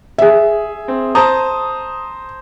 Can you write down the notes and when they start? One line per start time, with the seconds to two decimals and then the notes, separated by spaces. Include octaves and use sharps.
0.18 G#4 E5
0.88 C4
1.15 C5 A5 A#5 D#6